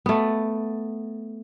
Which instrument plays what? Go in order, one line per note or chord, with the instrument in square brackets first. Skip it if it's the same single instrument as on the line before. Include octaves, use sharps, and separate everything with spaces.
[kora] A3 B3